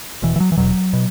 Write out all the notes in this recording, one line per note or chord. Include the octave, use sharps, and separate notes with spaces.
E1 E2 B2 E3
E3
F#3
E3
E1 E2 B2 F#3
B2